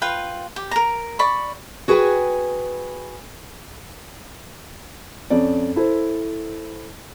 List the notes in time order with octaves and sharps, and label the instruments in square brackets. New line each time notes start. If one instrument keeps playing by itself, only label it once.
[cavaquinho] F4 B4 G5
G4
A#4 A#5
D5 B5 C#6
[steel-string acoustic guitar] F#4 G#4 B4 G5 G#5
[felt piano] F2 C#4 D5
E4 A4 C5